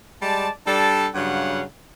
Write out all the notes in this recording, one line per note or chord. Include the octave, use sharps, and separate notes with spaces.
G3 G#3 D5 A5
G3 D4 A4 A5
G2 C#3 F#3 F5 F#5